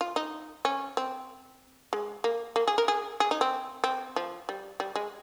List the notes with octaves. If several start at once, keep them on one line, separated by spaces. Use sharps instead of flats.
F4
D#4
C#4
C4
G#3
A#3
A#3
G#4
A#4
G#4
G#4
D#4
C4
C4
F3
G3
G3
G#3